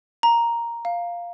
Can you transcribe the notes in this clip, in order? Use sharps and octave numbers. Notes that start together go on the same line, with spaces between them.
A#5
F5